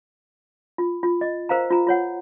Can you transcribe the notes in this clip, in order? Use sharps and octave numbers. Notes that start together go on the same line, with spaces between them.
F4
F4
D#5
A#4 C5 F5 A#5
F4 A#5
F4 C#5 F#5